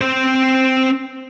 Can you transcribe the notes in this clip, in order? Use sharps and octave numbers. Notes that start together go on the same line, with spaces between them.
C4 C5